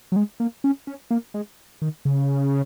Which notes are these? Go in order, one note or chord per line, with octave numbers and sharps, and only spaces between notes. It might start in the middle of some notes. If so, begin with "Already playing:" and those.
F#3
G#3
A#3
C#4
C#4
A#3
G#3
D#3
C#3